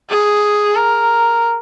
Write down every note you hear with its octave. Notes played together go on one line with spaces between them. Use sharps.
G#4
A#4